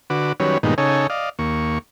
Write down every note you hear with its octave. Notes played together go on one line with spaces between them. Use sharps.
D3 F#4 B4 D6
D#3 F#3 G3 C#4 B4 C#5
G2 A#2 D#3 G#3 B3 D#4
C#3 D#4 A4 C#5 G#5
D5 D#5 F5
D#2 A#3 C#6